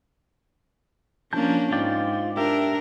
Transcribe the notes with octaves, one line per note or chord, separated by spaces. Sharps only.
F3 A#3 C#4 D4 A5 G6
G#2 F4 D5 G5
D4 G4 A#4 E5